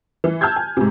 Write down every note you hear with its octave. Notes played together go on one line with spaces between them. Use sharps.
E3
A5 E6 F6 G6 G#6
G#5
G#2 C3